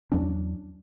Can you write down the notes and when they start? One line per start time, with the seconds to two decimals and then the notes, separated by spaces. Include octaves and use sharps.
0.12 E2 F#3 C#4 D4